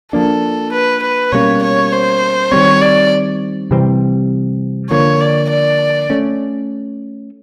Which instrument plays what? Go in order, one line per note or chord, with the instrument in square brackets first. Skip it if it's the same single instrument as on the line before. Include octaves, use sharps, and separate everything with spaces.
[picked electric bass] F3 A#3 D4 [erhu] A4
[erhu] B4
B4
[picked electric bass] B2 G3 A#3 C#4 [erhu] C#5
[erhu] C#5
C5
[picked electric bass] D#3 G3 C4 [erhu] C#5
[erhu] D5
[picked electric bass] C3 E3 G3 C4
[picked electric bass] D3 F3 A#3 [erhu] C#5
[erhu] D5
D5
[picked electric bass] A3 C#4